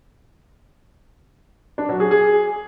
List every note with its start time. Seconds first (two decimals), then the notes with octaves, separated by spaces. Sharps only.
1.78 D4
1.89 F#3
2.00 G#4
2.11 G#4